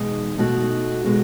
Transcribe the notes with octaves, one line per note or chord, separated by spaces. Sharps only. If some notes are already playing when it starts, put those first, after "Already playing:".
Already playing: E2 B2 G#3 D#4
B2 A3 D#4 F#4
B2 G#3 B3 F#4